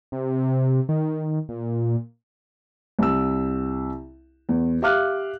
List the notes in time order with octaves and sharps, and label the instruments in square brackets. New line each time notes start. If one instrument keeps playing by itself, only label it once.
[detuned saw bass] C3
D#3
A#2
[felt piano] C2 E6
E2
G4 E5 F5 D6 F6 F#6